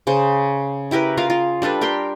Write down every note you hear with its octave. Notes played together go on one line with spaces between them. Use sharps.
C#3 G#4 C5
E4 G4 A#4 B4
F4 G#4 A#4 F5
F4
G3 D4 A4 B4
G4 A#4 G5 C6